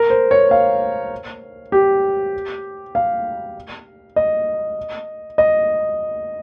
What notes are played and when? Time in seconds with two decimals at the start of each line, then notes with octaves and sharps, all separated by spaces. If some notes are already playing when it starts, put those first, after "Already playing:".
Already playing: A#4
0.10 C5
0.31 C#5
0.51 F5
1.72 G4
2.95 F5
4.16 D#5
5.38 D#5